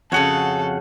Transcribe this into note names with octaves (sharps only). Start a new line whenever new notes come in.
F2 C#3 F#4 G#4 A4 C#5 F#5